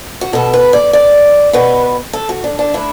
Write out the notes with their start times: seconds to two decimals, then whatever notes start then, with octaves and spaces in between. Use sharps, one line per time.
0.21 F#4
0.33 B2 B3 A4
0.54 B4
0.73 D5
0.93 D5
1.53 B2 B3 B4
2.13 A4
2.29 F#4
2.44 D4
2.59 D4
2.74 D3 A3 E4